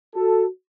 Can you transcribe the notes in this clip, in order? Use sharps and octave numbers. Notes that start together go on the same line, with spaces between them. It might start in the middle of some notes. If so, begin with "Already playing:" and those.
F#4 A4